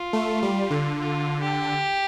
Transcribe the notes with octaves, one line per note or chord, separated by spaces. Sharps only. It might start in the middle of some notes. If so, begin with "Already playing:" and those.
Already playing: F4
A3
G3
D3
F4
G4